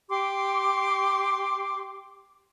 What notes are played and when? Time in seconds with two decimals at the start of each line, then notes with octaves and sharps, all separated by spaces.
0.09 G4 C6 D6